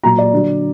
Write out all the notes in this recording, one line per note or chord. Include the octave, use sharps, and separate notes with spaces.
A#2 F#3 A#5
D5
D3 F#3